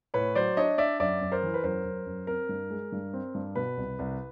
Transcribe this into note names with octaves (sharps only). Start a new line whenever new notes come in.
A2 B4 C#5
F#3 C5 D5
D4 C#5 D#5
D4 D5 E5
F#2 D5 E5
F#2
A#4 C5
E3
B4
F#2 A#4 C5
F#2
F#2
C4 A#4
G2
G#3
G2
C4
G2
B2 B4
C2
C2